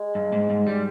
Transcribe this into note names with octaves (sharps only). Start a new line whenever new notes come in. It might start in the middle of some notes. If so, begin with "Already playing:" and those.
Already playing: G#3
G2
G#2
G#2
G3